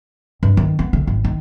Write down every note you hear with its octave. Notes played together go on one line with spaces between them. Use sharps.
G2
D#3
B3
D3
G#1
D#3